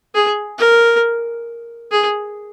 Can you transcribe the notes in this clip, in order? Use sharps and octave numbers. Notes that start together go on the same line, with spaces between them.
G#4
A#4
G#4